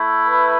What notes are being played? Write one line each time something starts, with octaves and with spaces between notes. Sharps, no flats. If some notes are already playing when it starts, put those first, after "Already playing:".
Already playing: A3 E4
B4